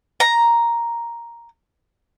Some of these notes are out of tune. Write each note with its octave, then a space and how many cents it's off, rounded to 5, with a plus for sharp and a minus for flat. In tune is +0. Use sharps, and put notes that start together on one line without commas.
A#5 +5